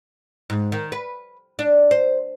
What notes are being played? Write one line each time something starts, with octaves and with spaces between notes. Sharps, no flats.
G#2
D#3
B4
D4
C5